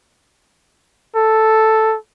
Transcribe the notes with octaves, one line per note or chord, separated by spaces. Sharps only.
A4